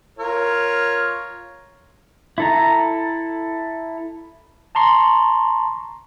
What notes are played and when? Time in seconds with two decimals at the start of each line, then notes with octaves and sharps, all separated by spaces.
0.18 F4 A#4 C#5
2.38 E4 A4 A#5
4.75 A5 A#5 C6 C#6